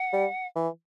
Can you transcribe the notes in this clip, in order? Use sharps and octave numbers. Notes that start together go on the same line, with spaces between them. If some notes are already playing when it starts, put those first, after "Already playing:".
Already playing: F#5
G3
E3